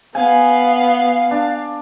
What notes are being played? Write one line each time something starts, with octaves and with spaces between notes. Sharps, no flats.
B3 F5 G#5
D4